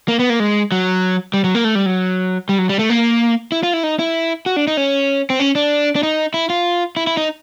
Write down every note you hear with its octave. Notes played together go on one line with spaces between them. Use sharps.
A#3
B3
A#3
G#3
F#3
G3
F#3
A#3
A3
G3
F#3
G3
F#3
G3
A3
A#3
E4
F4
E4
D#4
E4
F#4
D4
D#4
C#4
C4
C#4
D4
D4
D#4
E4
F4
E4
E4
D#4